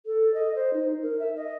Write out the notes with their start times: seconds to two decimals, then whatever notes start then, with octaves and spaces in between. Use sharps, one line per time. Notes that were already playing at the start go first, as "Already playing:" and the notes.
0.06 A4
0.34 D#5
0.55 C5
0.74 D#4
1.02 A#4
1.19 E5
1.36 D#5